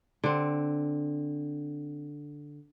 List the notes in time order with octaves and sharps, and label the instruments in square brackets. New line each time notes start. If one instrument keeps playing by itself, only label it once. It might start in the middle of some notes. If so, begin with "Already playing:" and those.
[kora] D3 C4